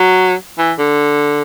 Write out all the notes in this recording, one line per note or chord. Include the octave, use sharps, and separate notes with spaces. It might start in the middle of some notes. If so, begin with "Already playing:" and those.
Already playing: F#3
E3
D3